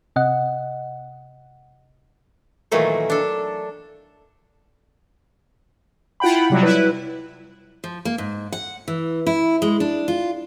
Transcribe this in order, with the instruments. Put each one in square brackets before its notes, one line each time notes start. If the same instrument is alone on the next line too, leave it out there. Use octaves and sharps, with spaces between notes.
[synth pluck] C3 D#5 F#5
[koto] A#2 D#3 E3 F#3 A3
D4 A4
[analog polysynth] E4 F4 F#5 G5 B5
C3 F#3 G3
E4 B4
[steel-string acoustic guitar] F3
A#3
G#2
F#5
E3
E4
G#3
D4
F4